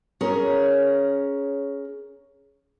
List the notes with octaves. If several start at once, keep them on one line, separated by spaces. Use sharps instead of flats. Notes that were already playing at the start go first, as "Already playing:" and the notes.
C#4 G#4 A#4 C#5